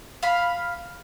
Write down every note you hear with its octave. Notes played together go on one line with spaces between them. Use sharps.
F5 B5